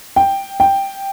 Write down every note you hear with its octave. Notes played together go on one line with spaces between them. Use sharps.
G5
G5